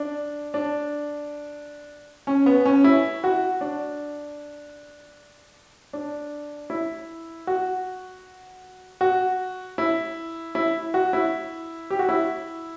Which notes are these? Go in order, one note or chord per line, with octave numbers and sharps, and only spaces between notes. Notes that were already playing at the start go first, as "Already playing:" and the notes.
Already playing: D4
D4
C#4
B3
C#4
E4
F#4
D4
D4
E4
F#4
F#4
E4
E4
F#4
E4
G4
F#4
E4